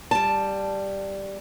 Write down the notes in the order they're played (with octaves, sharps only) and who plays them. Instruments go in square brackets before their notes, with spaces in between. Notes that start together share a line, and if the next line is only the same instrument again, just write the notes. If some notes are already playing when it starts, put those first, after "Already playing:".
[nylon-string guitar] G3 A5